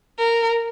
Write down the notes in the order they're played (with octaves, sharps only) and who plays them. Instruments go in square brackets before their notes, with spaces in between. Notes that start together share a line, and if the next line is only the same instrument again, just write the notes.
[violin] A#4